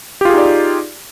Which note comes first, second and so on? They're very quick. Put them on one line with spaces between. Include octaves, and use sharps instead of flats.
G4 F4 G#4 D#4 D5